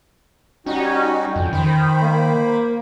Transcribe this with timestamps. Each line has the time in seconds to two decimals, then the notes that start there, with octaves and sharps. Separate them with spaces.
0.66 G3 C#4 D#4 F#4 G5
1.36 F2
1.53 D#3 C5 B5
2.02 A#3